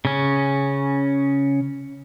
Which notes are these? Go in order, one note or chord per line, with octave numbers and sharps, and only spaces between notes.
C#3 C#4